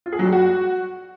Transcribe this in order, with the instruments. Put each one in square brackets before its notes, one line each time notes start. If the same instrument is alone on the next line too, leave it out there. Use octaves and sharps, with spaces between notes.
[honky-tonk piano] F4
G#4
F#3
G3
F#4